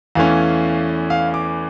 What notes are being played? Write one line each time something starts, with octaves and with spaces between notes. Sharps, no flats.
E2 E3 A3 C#4 F5
F5
D6